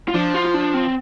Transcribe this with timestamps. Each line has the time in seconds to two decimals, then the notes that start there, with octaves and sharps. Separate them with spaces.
0.08 F4
0.14 F3 D4
0.34 F4
0.45 F4
0.54 D4
0.74 C4